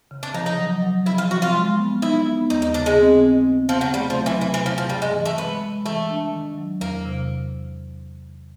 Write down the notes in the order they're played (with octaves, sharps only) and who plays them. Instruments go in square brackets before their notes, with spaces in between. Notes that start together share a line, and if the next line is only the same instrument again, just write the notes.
[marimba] C#3
[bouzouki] D4
[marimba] F3 [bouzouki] D#4
[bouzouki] D#4
[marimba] F#3
F#3
[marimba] F3 [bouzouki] E4
[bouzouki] F4
[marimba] F3 [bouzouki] F#4
[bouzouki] F4
[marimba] G#3
B3
[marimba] D#4 [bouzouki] E4
[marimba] B3
[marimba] D#2 [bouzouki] D#4
[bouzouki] D#4
[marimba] C#3 [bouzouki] D4
[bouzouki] G#3
[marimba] C4
C4
B3
[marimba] C#3 [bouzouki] F3
[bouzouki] F#3
[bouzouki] G3 [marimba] A3
[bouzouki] F3
[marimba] F#3
[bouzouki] E3
[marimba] C3 [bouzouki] E3
[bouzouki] E3
[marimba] C3 [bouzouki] F3
[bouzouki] F3
[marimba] G2 [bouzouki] G3
[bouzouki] G#3
[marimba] E3
[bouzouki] A3
[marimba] G#3 [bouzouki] B3
[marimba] G#3
[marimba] E3 [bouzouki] A3
[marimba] D4
D#3
F#3
[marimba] E2 [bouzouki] A#3
[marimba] C3